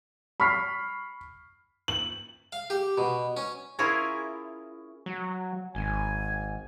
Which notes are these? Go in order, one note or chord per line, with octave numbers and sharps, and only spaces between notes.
B5 C#6 F6 B6 C7
F#7
F5
G4
B2
C#4
C#4 E4 F4 G#4 A#4 C#5
F#3
G#1 G#5